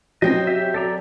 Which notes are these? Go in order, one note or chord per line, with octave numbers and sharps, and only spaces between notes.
F#3 C4 C#4 C5 D#5
G4 E5
A4 D5 A#5